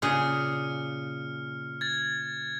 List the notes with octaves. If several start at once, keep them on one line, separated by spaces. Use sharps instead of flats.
A#2 C#3 G#4 F6 C#7
G#6 A6